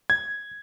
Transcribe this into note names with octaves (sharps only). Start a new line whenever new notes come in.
G#6